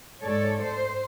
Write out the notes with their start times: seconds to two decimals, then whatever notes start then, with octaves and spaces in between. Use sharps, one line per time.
0.22 G#2 A4 C#5 D5
0.64 C5